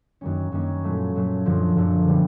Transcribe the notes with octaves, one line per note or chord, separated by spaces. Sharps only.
F#2 D#3 G3 A#3 C#4
F#2 D#3 G3 A#3 C#4
A#2 F#3 A3
A#2 F#3 A3
F#2 D3 F3
F#2 D3 F3
D3 G3 B3